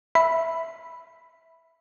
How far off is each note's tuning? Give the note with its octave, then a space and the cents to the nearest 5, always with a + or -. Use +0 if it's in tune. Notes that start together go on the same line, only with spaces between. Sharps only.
E5 +0 B5 +0